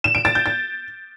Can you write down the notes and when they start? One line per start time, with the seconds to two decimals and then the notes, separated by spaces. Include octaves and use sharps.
0.04 E7
0.15 D7
0.25 A6
0.35 G6
0.46 A6